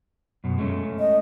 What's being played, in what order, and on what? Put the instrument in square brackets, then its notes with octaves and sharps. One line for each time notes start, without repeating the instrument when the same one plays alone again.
[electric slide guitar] F#2 B2
G#3 A3 C#4
[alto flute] D#5